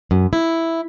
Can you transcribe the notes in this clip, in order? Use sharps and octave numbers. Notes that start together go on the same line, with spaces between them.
F#2
E4